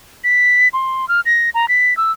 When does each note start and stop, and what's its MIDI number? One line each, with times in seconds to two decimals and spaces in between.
0.24 0.68 95
0.73 1.08 84
1.08 1.21 89
1.26 1.50 94
1.54 1.68 82
1.68 1.96 95
1.97 2.12 88